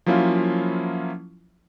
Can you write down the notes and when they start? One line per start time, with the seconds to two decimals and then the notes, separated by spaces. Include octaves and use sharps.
0.06 F3 F#3 A#3 C#4 E4 F4